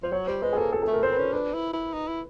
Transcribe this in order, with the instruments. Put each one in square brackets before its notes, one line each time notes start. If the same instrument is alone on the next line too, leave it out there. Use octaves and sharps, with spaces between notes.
[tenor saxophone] F3 [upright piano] C5
[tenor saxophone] F#3 [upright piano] C#5
[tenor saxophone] G3 [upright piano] C5
[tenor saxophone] G#3 [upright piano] B4
[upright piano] G#4
[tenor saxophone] A#3 [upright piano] A4
[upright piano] A4
[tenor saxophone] A3 [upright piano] A4
[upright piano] A#4
[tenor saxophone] C4 [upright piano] C5
[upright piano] B4
[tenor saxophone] C#4
[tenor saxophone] D4 [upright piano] B4
[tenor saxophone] E4
E4
D#4
E4